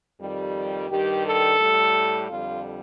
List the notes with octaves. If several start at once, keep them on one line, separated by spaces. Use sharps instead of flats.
F2 D#3 G3
G2 D#3 G3 G4
A4
A2 G3
F2 D3 G3 F4